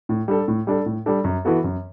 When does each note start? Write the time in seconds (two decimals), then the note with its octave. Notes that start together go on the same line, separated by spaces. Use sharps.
0.09 A2
0.28 G3 D4 A4
0.48 A2
0.67 G3 D4 A4
0.86 A2
1.06 G3 D4 A4
1.24 F#2
1.45 E3 B3 F#4 A4
1.64 F#2